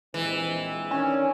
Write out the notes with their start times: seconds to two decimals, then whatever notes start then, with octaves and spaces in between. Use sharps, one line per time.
0.14 A#1 E3 G#3 C4
0.91 D#3 C#4 D4